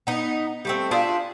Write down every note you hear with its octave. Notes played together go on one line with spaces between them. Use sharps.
B3 D#4
G3 A3 C4
D4 F4 G#4 E5